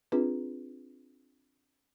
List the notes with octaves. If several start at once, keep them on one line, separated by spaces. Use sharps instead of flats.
C4 D4 F4 G#4 B4